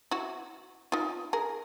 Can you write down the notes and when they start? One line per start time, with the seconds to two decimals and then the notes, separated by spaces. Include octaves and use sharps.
0.11 E4 F#4
0.92 D#4 F4
1.33 G#4 A#4